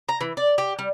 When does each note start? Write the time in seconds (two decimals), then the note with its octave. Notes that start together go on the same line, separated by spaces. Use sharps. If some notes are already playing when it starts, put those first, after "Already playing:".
0.09 A#5
0.21 E3
0.37 D5
0.58 G4
0.79 G3